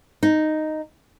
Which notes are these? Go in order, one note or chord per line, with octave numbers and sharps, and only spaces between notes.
D#4